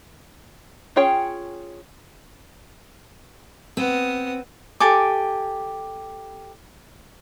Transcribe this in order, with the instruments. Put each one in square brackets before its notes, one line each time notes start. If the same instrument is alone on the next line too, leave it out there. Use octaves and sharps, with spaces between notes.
[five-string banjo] C#4 F4 G#4 C#5 G5
[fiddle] B3 D#6 [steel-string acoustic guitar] C4
[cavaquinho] G4 A4 G#5 D6